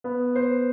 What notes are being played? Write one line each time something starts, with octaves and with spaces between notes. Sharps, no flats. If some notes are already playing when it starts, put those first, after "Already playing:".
B3
C5